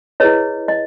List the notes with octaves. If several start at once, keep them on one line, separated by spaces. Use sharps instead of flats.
E4 G#4 B4 C#5 D#5
D#5